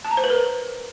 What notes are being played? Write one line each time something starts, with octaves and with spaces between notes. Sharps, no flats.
A5
A#5
C5
B4
A#4